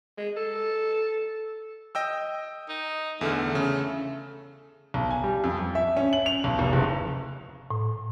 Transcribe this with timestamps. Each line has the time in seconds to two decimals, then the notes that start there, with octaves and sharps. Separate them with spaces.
0.18 G#3
0.37 A4
1.95 D#5 G5 E6
2.69 D#4
3.21 E2 D3 A3 F6
3.55 C#3
4.94 B1
5.11 G#5
5.24 G3
5.44 F2
5.59 F2
5.75 E5
5.97 C#4
6.13 F#7
6.26 F7
6.44 B1
6.59 F1
6.73 F#1
7.70 A2